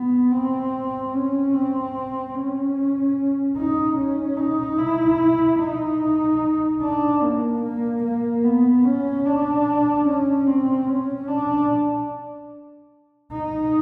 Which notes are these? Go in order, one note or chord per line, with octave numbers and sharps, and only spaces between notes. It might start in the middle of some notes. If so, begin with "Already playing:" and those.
Already playing: B3
C4
C#4
C4
C#4
D#4
C#4
D#4
E4
D#4
D4
A#3
A#3
A#3
B3
C#4
D4
C#4
C4
C#4
D4
D#4